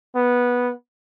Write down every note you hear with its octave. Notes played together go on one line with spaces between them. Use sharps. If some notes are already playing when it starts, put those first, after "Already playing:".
B3